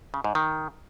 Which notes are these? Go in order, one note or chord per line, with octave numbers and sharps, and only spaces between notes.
C#3
G#2
D#3